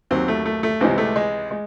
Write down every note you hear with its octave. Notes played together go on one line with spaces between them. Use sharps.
D#2 D#3 F#3 C4
A3
A3
A3
C#2 C3 E3 G#3 C4
A3
G#3
G#3